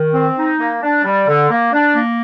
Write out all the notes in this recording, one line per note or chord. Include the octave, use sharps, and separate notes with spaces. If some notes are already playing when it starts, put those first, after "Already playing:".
Already playing: D#3
C4
D#4
A#3
D4
G3
D3
A#3
D4
A#3